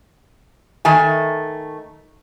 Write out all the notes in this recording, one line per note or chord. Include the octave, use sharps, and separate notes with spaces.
D#3 A3 G#5